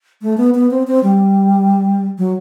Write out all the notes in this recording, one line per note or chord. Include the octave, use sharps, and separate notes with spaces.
A3
B3
B3
C4
C4
G3
F#3